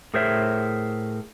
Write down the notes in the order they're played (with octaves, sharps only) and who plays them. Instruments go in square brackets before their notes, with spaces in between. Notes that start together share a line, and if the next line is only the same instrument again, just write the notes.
[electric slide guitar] A2 G#4 A#4 C5 C#5 E5